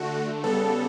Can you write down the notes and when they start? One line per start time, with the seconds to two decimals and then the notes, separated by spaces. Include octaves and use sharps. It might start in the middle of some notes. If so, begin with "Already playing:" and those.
Already playing: D3 A3 F#4
0.43 C#3 G3 B3 A4